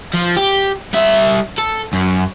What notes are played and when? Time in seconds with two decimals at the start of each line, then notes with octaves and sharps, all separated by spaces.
0.14 F3
0.36 G4
0.93 G3 E5
1.58 A4
1.93 F#2